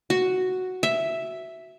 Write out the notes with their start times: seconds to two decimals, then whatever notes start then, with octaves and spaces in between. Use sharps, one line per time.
0.10 F#4
0.83 E5